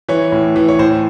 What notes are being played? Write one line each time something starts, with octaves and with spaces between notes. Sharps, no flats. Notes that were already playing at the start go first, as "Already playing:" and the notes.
E3 C#5
A2
E3
C#5
A2 C5